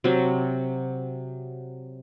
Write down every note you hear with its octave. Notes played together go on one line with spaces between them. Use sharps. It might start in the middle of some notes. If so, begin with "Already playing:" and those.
C3 F#3